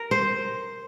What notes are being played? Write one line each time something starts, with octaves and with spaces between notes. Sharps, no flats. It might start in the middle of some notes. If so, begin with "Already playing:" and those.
Already playing: A#4
C5